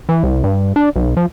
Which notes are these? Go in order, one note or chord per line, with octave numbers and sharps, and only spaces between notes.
E3
C2
G2
D4
B1
F3